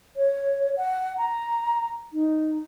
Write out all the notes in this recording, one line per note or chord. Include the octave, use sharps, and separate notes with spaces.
C#5
F#5
A#5
D#4